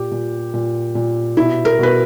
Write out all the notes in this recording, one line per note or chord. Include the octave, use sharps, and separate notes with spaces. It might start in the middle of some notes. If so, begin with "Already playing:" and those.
Already playing: A#2 G4
A#2
A#2
A#2
B2 E4
A#4
B2 B4